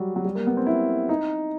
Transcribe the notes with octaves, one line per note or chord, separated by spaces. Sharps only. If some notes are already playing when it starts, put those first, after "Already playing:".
Already playing: F#3 G3
F#3
G3
A#3
B3
C4
E4
D#4